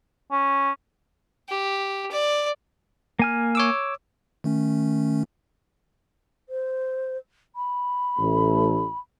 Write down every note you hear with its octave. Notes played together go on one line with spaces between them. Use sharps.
C#4
G4
D5
A#3 G#5 F6
C#5 D6 E6
D#3 A3 C#4
C5
B5
A1 A3